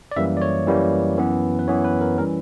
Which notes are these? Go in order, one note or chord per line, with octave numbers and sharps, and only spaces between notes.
D5
F#2 E3 G3 A#3 E5
D5
C#5
F#2 E3 G3 A#3
F#2 E3 B3
B4
F#2 E3 B3 C#5
B4
A#4
E3 G3 C#4 A#4